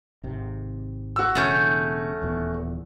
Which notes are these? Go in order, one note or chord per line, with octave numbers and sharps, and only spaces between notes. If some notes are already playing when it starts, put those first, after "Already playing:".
G#1 C3
F#4 E6
E1 C#3 A3 C#4 G6
D#1 E2